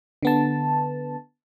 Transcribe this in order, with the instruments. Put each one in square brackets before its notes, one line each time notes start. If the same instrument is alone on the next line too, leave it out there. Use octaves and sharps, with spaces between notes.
[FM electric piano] D3 B3 A5